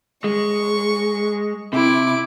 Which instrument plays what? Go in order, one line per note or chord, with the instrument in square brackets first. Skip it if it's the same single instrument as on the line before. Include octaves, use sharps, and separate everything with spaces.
[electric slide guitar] G#3 [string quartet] C#6
[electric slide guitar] C3 [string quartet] E4 D6